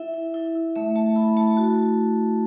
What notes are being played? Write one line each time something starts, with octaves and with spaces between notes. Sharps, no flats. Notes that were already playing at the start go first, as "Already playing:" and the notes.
Already playing: E4 E5
E4
E4
E4
A3 E5
A3 A5
E4 B5
A3 A5
F#4